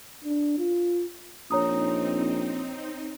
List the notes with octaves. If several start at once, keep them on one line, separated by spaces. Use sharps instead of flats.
D4
F4
A#1 C4 D#4 C#5 A#5 D#6